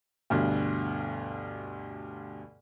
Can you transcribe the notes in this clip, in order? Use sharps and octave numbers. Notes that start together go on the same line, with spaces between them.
D2 G2 B2